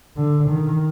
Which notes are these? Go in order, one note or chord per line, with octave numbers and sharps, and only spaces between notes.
D3
D#3